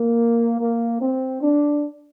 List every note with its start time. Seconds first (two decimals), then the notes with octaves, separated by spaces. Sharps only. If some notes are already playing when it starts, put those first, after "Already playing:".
Already playing: A#3
0.60 A#3
1.01 C4
1.41 D4